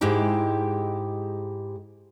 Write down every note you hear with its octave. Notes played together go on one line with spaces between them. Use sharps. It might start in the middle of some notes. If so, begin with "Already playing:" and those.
G#2 G#3 E4 G4 G5